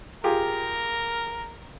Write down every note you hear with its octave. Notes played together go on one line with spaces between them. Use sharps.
F4 G4 G#4 A#4